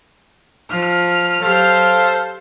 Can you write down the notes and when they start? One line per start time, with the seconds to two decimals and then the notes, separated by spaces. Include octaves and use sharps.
0.71 F3 F6
1.42 F#3 G4 A4 C5 F5